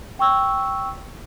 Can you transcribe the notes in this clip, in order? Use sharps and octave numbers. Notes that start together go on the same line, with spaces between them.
G5 C#6 E6